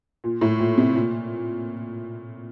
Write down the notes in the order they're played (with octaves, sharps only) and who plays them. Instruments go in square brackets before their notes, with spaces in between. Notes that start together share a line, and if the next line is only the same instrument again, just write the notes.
[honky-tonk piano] A#2
A2
A#2
C3
A#2